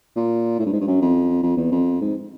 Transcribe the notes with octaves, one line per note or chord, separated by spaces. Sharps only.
A#2
A2
G2
G#2
G2
F#2
F2
F2
E2
F2
G#2